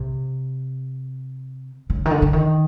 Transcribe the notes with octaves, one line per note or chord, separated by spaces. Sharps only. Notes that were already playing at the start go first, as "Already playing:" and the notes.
Already playing: C3
C#3
D#3
D3
D3
D#3